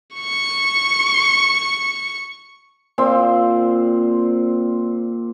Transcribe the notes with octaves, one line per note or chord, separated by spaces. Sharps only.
C#6 C#7
A#2 C4 C6